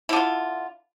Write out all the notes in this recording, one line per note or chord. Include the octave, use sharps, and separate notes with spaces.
D3 E4 F4